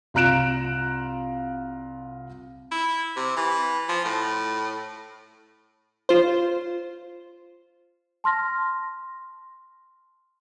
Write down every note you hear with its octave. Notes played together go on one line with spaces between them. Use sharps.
C2 F4 A#5 F#6 D7 E7
E4
C3
E3
F3
A2
F4 C5
A5 C6 F6 A#6